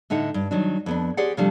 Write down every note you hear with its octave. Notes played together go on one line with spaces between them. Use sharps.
A2 D3 D#4 E5 F#5
G2
D#3 F#3 D4
F2 B3 D4
G4 G#4 C5 D5 F#5
C3 F3 G3 A3 D4